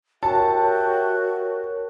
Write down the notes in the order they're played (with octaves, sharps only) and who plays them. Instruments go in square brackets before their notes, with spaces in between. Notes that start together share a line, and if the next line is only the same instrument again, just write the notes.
[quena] F#4 [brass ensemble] G4 E5 G5 [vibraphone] A#4 C#5 [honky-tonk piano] A5